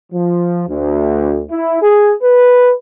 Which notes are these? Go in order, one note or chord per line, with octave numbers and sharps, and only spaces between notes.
F3
D2
E4
G#4
B4